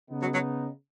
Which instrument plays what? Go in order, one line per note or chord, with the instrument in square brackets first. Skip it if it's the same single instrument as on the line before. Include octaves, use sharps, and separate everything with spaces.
[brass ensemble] C#3 B3 D#4
[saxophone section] F#3
F#3